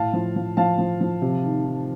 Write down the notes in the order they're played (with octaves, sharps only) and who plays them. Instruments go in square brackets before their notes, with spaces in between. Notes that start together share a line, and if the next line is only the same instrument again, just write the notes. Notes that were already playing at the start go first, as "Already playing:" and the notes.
Already playing: [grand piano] A2 F5 A5
F3
F3
F3 F5 A5
F3
F3
C3
D#3
D#3